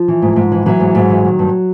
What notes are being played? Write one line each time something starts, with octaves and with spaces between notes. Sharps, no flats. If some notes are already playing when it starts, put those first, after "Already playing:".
Already playing: F3
E3
G#2
G#2
E3
E3 F#3
G#2
G#2
E3
D#3
G2